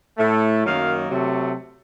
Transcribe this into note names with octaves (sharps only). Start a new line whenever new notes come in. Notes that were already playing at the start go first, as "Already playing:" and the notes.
A2 A3
F#2 D#3 F#3 A#3 F5
C3 F#3 A3